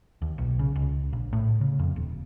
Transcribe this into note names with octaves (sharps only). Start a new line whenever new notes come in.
D#2
B1
C#3
C#2
A#1
A2
C#3
F2
D#1